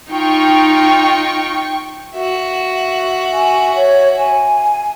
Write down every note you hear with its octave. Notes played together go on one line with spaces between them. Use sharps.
D#4 F4 G5 C#6
F#4 E5
G#5
C#5
G#5